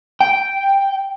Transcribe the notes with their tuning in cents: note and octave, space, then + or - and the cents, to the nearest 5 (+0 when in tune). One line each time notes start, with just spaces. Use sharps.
G5 -5